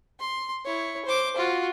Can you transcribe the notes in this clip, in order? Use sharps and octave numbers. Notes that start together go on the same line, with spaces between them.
C6
E4 C#5
C5 D6
F4 F#4